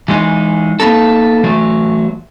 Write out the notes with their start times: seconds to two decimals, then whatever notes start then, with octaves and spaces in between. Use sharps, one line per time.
0.08 E3 G#3 D#4
0.80 A#3 B3 D#4 A4
1.43 E3 F#3 A3